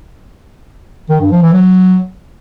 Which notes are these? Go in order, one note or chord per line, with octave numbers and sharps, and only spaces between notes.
D#3
G2
F3
E3
F#3